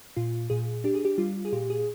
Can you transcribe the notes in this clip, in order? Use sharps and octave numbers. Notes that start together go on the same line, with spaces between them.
A#2 F4
A#2 G#4
D4 G4
G#4
G4
G3 F4
G#4
A#2 G4
G#4